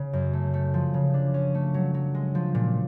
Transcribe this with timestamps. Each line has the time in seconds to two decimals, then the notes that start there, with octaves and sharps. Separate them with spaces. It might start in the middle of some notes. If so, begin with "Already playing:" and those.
Already playing: C#3
0.13 F#2
0.33 A3
0.53 A3
0.74 F3
0.94 C#3
1.14 D4
1.34 C#4
1.55 A3
1.74 F#3
1.94 F#3
2.14 G#3
2.35 F3
2.55 A#2